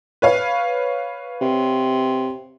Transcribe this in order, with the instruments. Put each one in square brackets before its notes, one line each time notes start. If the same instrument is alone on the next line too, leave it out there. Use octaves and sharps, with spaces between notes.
[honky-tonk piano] B4 C#5 F5
[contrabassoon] C3